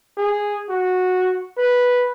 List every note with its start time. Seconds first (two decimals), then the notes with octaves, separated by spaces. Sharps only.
0.17 G#4
0.70 F#4
1.58 B4